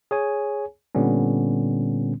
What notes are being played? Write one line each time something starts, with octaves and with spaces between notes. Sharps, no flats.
G#4 C#5 G#5
A#2 D3 G3 B3 C#4